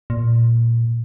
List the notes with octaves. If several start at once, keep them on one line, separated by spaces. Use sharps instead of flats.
A#2